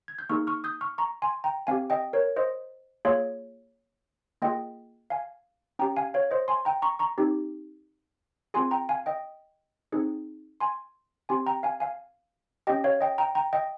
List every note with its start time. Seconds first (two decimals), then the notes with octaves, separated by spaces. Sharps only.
0.08 G#6
0.19 G6
0.29 A#3 D#4 G#4 C#6 F6
0.47 C#6 F6
0.64 D#6 G6
0.81 C#6 F6
0.98 A#5 C#6
1.22 G#5 C6
1.44 G5 A#5
1.67 C4 G4 F5 G#5
1.90 D#5 G5
2.13 A#4 C#5
2.36 C5 D#5
3.05 A#3 F4 G#4 C#5 F5
4.42 A#3 F4 G#4 D#5 G5
5.10 F5 G#5
5.79 C#4 G4 G5 A#5
5.97 F5 G#5
6.14 C#5 F5
6.31 C5 D#5
6.48 G#5 C6
6.65 G5 A#5
6.82 A#5 C#6
6.99 A#5 C#6
7.18 C4 D#4 G4
8.54 C4 F4 G#4 G#5 C6
8.71 G5 A#5
8.89 F5 G#5
9.06 D#5 G5
9.92 C4 D#4 G#4
10.60 G#5 C6
11.29 C4 G4 G#5 C6
11.46 G5 A#5
11.63 F5 G#5
11.80 F5 G#5
12.67 C#4 G4 D#5 G5
12.84 C#5 F5
13.01 D#5 G5
13.18 G5 A#5
13.35 G5 A#5
13.53 D#5 G5